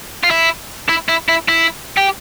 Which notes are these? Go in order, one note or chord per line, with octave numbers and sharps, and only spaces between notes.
F4
E4
E4
E4
E4
E4
G4